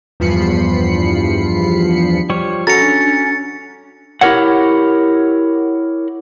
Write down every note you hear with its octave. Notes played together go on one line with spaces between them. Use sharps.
E2 G2 F3 B5 C7 C#7
F3 G3 C#5
C#4 F#4 A4 A#5 A6 C#7
D4
E4 G4 G#4 A#4 C#5 F#5